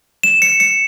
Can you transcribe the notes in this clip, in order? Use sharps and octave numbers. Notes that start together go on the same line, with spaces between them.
E7
C#7
C#7